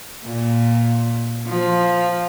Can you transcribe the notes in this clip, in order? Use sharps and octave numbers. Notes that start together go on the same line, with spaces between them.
A#2
F3